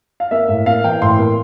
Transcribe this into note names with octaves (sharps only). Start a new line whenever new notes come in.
F5
A#3 E5
A2
A#3 F5
E3 G5
A2 C6
A#3